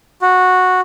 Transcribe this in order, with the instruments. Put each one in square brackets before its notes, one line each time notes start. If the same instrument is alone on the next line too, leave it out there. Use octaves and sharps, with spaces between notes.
[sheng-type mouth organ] F#4